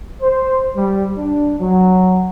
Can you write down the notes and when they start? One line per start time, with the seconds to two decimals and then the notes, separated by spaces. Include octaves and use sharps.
0.21 C5
0.76 G3
1.18 D4
1.60 F#3